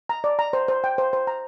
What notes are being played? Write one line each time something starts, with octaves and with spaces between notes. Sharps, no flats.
A#5
D5
A#5
C5
C5
G5
C5
C5
A#5